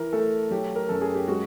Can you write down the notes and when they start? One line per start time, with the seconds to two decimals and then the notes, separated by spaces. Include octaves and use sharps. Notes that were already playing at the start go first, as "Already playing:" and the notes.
Already playing: E3 A#4
0.13 A3 A4
0.51 F#3 G4
0.76 A#4
0.89 F#2 A4
1.02 G#4
1.15 G4
1.28 G#3 F#4